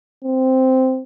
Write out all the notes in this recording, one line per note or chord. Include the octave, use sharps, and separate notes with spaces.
C4